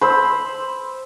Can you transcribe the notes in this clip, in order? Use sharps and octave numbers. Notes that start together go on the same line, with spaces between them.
C5 B5 E6